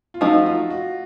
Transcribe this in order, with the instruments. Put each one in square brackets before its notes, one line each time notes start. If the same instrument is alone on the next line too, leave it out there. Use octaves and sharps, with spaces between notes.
[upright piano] F4
[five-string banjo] F3 A3 C4 D#4 [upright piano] F#4
[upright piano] F4
F#4